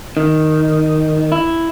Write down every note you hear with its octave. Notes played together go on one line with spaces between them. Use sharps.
D#3
E4